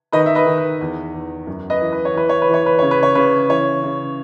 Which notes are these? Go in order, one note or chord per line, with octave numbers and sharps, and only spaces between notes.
D#3 B4 D#5
E5
B4 D#5
D#3
B4
E2
E2
F#2
B4 D#5
E3
B4
C#5
E3 B4
C#5
B4
E3
C#5
B4
C#3 C#5
B4
C#5
C#3 B4
E3 C#5
C#3